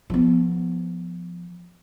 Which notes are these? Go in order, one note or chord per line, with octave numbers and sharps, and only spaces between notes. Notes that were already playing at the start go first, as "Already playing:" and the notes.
F3 B3